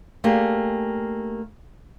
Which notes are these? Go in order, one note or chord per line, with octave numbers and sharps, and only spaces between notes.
A3 A#3 D4 G4 G#4